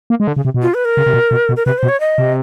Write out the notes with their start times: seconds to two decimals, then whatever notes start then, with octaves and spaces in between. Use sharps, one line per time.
0.10 A#3
0.20 G#3
0.27 D3
0.36 C#3
0.45 C3
0.54 B2
0.62 F4
0.74 B4
0.85 A#4
0.97 C#3
1.06 C3
1.14 B2
1.31 B2
1.49 B2
1.57 A#4
1.66 C3 B4
1.78 B2 C5
1.89 C#5
2.00 D#5
2.18 C3